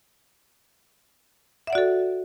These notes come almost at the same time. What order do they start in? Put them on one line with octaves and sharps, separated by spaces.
E5 F#5 D5 F#4 A4